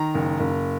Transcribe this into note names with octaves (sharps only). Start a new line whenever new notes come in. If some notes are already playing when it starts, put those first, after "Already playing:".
Already playing: D#3 A#5
F#1
F#1